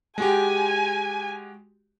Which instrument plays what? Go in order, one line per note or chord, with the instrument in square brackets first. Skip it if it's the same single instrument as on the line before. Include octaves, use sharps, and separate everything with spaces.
[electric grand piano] G#3 F#4 G4 [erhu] G#5